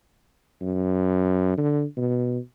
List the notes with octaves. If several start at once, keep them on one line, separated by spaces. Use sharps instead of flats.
F#2
D3
B2